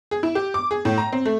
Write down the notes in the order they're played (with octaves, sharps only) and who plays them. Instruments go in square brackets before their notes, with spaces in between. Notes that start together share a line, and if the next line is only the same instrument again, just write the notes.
[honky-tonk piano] G#4
E4
G4
D6
G#4
A2
A#5
C4
A3